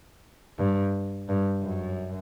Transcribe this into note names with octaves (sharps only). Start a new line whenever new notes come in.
G2
G2
F#2